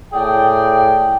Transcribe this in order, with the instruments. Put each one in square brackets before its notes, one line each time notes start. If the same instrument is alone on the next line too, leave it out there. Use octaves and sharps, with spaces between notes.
[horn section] A2 G#4 D5 G5